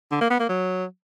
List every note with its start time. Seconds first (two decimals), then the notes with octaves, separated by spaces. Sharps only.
0.12 D3
0.21 A#3
0.30 B3
0.40 A#3
0.49 F#3